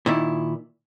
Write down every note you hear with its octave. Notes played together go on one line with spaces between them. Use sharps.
A#2 D#3 E4